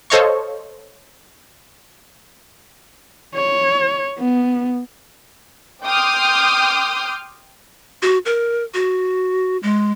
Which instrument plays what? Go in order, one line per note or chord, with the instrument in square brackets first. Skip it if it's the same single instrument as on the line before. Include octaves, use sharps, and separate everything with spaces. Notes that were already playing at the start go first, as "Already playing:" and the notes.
[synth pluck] A4 C5 C#5 D#5 F5 C#6
[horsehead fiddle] C#5
B3
[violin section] G5 C6 D6 D#6 F6 G6
[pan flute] F#4
A#4
F#4
G#3